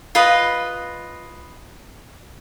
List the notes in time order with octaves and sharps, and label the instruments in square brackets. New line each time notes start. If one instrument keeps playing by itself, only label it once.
[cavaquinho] F4 B4 D#5